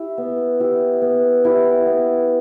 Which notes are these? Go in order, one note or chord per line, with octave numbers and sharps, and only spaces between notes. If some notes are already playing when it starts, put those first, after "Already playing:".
Already playing: E4 G4
B3
E4 G4
B3
E4 G4
B3